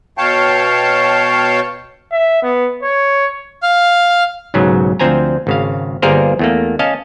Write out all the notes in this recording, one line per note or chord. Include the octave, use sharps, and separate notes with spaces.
B2 C#5 F5 G5 A5
E5
B3
C#5
F5 F6
B1 G#2 C#3 F#3
D2 F3 C4 C5 G#5 A#5
G#1 C#3 F5
G1 G3 A#3 G#4 A#4 C5
E2 A3 A#3
C#4 D#5 F5 A5